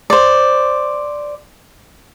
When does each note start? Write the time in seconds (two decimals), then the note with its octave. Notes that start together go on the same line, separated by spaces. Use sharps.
0.10 C5 D5